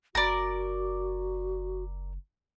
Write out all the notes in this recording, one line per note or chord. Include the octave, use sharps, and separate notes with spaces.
F#1 F#4 A#4 D5